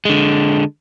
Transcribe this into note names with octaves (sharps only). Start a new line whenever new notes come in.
D3 G#3